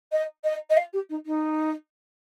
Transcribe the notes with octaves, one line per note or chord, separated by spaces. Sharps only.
D#5
D#5
D#5
F5
G4
D#4
D#4